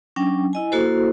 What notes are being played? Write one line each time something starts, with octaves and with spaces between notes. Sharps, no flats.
F#3 C#4 D4 G5
E4 D#5 G#5
A#3 E4 F#4 A4 C5